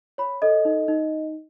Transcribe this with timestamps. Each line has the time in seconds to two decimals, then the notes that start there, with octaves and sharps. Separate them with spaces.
0.18 C#5 B5
0.42 A4 D#5
0.65 D#4
0.88 D#4